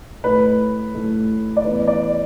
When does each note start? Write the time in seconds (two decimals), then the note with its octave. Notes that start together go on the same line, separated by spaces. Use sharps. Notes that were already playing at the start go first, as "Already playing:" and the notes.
0.24 A2 A3 B4
0.95 A2 A3
1.57 D5
1.64 A2 E3 B3 B4
1.88 D5